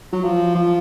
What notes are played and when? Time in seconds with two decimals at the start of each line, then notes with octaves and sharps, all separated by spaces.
0.12 F#3
0.24 F3
0.55 F3